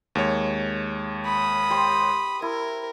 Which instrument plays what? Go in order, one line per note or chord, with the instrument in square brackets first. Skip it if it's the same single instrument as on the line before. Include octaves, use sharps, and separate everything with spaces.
[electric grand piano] D#2 G#3 C#5
[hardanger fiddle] B5 D#6
[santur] G4 C5 C6
[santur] E4 [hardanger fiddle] A#4